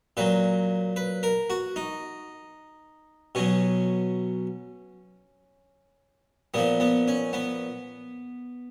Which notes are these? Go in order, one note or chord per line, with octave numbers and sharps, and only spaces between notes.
A#2 F#3 B4
B4
A#4
F#4
D#4
B2 F#3 C#4
A#2 F3 B3
B3
C#4
B3